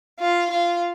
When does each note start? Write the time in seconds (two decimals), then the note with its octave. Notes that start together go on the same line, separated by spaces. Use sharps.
0.18 F4
0.50 F4